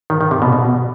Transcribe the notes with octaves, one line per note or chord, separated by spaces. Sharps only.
D#3
D#3
C3
B2
B2